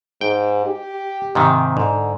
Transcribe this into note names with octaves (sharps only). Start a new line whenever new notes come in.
G#2 G5
G4
G#2 C3 D#3
G#2 D3